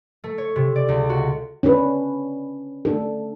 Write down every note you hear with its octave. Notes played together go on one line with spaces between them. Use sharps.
A3
C#5
C3
D5
C#2
F#4
C#4 D4 B4
A3 D4 A4